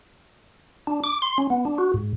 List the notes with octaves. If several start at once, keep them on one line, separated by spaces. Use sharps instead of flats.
D4
D6
C6
C#4
B3
D4
F#4
G#2